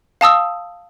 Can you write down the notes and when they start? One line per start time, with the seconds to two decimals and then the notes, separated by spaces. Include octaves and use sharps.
0.21 F5 A5 D#6 E6